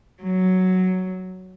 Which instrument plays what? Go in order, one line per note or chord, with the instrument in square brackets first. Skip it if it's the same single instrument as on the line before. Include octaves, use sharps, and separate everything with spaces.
[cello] F#3